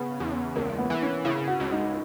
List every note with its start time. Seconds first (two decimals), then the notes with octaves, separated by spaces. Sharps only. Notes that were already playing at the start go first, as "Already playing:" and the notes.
Already playing: C#3 B3
0.20 E2
0.56 C#2 A#3
0.78 B3
0.90 E3
1.02 C#4
1.24 C#3 E4
1.48 F#4
1.60 C#2
1.72 D#4